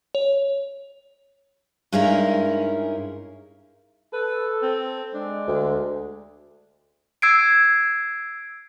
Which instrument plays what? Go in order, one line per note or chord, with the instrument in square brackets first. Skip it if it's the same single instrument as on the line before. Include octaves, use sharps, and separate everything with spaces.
[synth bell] C#5
[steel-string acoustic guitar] G2 G#3 C#4 D#4 E4 A#4
[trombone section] A4 [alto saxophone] B4
[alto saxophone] C4
[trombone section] G#3 [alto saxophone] D4
[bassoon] D2
[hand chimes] E6 G#6 C7 D7